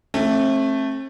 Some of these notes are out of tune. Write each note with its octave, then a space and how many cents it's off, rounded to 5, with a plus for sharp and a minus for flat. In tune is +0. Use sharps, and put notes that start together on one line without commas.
A3 +0 C4 +45